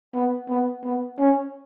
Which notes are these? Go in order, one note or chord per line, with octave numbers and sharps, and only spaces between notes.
B3
B3
B3
C#4